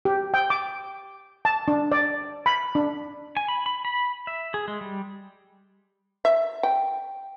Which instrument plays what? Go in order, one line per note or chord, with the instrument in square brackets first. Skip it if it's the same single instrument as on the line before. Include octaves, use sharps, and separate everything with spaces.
[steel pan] G4
G5
D6
A5
D4
D5
B5
D4
[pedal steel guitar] G#5
B5
B5
B5
E5
G#4
G#3
G3
[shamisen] E5
G5